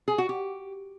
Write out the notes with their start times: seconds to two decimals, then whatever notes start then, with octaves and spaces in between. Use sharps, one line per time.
0.08 G#4
0.18 F#4
0.29 G4